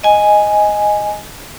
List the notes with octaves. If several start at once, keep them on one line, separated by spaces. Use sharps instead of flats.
D#5 G#5